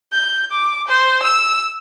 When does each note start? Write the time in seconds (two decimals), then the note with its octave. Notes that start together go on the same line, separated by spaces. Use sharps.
0.12 G6
0.51 D6
0.88 C5
1.22 E6